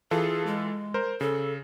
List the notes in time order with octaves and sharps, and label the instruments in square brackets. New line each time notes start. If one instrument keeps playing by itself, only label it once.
[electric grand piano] E3 F4 A4 [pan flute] G#4
[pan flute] G#3
[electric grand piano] A#4 C5
[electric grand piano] C#3 [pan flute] A4